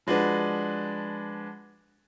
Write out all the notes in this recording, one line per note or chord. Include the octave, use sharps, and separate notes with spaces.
F3 G#3 D4 F#4 B4